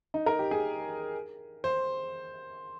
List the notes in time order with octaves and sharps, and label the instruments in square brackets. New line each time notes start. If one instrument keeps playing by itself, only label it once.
[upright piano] D#4
A#4
G4
G#4
C5